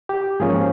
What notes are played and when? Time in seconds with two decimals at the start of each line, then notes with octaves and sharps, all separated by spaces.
0.09 G4
0.40 G#2 F3 A#3 C#4 G#4